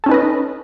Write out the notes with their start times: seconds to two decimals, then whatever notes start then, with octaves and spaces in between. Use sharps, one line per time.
0.04 A4
0.06 C#4
0.09 D#4
0.11 B4
0.14 D#5